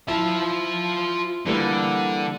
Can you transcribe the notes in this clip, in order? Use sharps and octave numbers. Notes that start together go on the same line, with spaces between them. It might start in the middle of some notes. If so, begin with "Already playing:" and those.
E4 F4 A5
D3 E3 G3 A#3